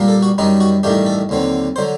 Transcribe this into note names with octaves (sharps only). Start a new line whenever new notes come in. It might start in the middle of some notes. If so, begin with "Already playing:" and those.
Already playing: A#2 G3 A#3 D4
A4
F#4
F#2 D#3 G3 D4 D#4
F#4
A1 G2 D#3 A3 D4 G4
A4
D#2 D3 F#3 C4
D3 F#3 C5